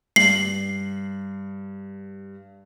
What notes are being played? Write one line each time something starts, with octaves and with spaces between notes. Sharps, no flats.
G2 C7 F#7